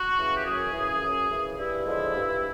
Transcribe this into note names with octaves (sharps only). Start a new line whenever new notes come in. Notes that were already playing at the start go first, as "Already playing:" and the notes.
Already playing: F#4
C#3 E3
G4
F#2 G#4
C#3 E3
F#2
C#3 E3
G2 E4
D3 F3 G#3
G2